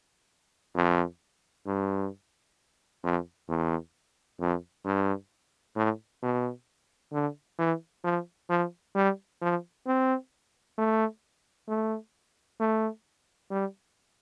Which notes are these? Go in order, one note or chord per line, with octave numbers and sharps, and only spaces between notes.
F2
G2
F2
E2
F2
G2
A2
B2
D3
E3
F3
F3
G3
F3
C4
A3
A3
A3
G3